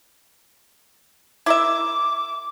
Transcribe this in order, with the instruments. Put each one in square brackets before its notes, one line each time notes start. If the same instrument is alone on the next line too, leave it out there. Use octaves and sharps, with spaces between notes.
[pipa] E4 A#4 E5 [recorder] D6